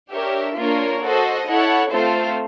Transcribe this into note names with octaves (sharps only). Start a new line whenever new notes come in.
D4 G4 A#4 C#5 E5
A#3 D4 F4 A#4 C#5
F#4 A4 C5 D#5
E4 A4 C#5 F#5
A3 C4 F4 A4 C5